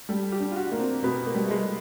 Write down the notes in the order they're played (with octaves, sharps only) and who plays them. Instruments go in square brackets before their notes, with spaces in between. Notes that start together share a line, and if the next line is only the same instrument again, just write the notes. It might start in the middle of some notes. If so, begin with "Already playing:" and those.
[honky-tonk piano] G3 [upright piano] A4
[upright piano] G4
[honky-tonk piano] D4
[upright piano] F4
F#4
[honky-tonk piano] A#3
[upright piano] C4
[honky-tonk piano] B2 [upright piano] B3
[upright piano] A#3
[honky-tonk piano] G3
[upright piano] A3
G#3